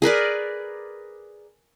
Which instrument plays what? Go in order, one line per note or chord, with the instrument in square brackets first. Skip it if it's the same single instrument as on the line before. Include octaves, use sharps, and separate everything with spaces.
[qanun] G#4 A#4 B4 D5